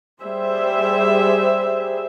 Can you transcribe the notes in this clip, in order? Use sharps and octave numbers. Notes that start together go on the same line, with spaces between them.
G3 G#4 C5 E5